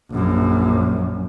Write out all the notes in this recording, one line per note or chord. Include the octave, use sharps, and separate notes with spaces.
A#1 F#2